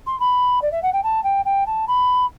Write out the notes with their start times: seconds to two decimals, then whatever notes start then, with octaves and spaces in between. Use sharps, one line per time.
0.07 C6
0.20 B5
0.62 D5
0.72 E5
0.83 F#5
0.93 G5
1.03 A5
1.24 G5
1.45 G5
1.66 A5
1.88 B5